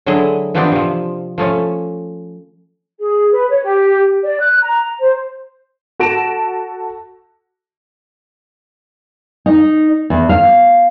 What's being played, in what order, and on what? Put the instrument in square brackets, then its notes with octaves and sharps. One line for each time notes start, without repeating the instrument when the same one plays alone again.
[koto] D3 F#3 G#3 E4 D#5
E3 F3 B3 C4 D4 G4
C3 F3
F3 A3 C#4
[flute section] G#4
B4
C#5
G4
D5
F#6
A#5
C5
[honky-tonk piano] F#4 A4 A5 A#6 D7 E7
[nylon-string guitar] D#4
E2
F5